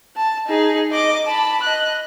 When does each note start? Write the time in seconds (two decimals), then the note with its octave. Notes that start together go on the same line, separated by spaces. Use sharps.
0.16 A5
0.47 D#4 G#4
0.92 D#5 D6
1.26 A5 B5
1.63 D#5 F#6